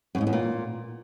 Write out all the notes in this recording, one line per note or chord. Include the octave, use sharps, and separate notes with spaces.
F#2
G#2
E2
A#2